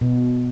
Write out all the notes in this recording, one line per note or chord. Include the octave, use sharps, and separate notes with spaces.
B2